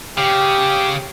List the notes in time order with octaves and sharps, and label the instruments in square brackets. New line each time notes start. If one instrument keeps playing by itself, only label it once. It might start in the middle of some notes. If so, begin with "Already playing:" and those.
[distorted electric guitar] C#3 [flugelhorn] G4